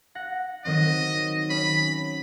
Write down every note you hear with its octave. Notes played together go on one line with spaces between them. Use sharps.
F#5 A#6
D#3 F#3 C4 D#5
C#4 B5